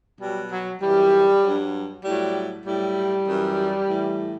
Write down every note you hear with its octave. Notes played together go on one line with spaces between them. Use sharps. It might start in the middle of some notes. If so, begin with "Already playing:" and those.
B2 F#3 G3
F#3
F#2 E3 G3
G2 F#3
A2 F#3 G3
A2 F#3 G3
F#2 E3
A2 E3